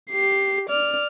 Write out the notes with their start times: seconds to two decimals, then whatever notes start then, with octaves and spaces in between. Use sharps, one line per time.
0.11 G4 C7
0.69 D5 F6